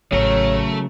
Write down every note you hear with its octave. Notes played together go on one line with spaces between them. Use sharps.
A1 C#3 F#3 A3 A#4 C#5